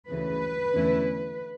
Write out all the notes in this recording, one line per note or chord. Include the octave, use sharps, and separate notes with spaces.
D2 C#3 E3 B4
E2 D3 A3 C#4 E4